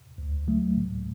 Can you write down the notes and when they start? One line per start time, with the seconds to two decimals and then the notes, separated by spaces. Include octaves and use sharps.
0.18 D2
0.47 D3 F#3 A3
0.76 A2